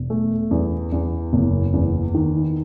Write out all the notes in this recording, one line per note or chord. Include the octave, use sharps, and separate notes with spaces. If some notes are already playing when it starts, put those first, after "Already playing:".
Already playing: E1
A3
E2
E2
F#1
E2
D#3